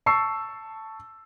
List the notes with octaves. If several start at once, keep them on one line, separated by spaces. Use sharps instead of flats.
A5 C#6 E6 C7